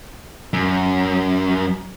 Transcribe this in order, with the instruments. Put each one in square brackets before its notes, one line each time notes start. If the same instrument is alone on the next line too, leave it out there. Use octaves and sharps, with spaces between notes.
[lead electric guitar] F#2